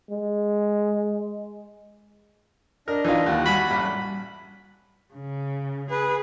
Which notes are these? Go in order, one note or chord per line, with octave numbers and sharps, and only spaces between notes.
G#3
D4 A#4 D#5
E3 D#4 F4
D#2 F4 F#5
G3 F#4 G#5 B5
A1
C#3
G#4 B4